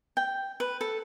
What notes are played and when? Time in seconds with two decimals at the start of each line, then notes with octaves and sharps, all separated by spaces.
0.17 G5
0.60 B4
0.81 A4